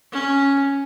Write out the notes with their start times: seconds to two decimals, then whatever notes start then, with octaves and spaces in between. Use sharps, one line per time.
0.12 C#4